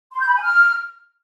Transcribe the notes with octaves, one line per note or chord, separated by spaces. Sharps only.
C6
G6
B5
G#5
F6